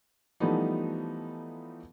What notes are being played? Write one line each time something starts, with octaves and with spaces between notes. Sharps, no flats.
E3 F3 G3 A3 B3 D#4